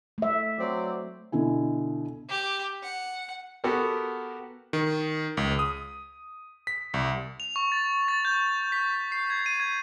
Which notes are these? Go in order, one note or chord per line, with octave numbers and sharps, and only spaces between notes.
A3 E5
F#3 C4 D5
B2 D3 E4 G#5
G4
F#5
B3 F#4 G4 A4 A#4
D#3
C#2
D#6
B6
C2
F7
C#6
A6
A6
G6
B6
C7
G#6
D#7
G#6